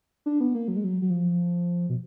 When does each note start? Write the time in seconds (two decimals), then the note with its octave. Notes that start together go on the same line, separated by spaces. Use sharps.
0.26 D4
0.40 B3
0.55 A#3
0.68 F#3
0.76 G#3
0.84 F#3
1.02 F#3
1.10 F3
1.89 B2